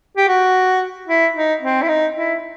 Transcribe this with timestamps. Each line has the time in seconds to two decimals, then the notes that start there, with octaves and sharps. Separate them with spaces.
0.17 G4
0.28 F#4
1.08 E4
1.35 D#4
1.62 C4
1.82 E4
1.88 D#4
2.16 E4